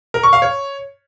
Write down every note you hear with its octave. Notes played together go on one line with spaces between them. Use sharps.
A#4
C#6
F5
C#5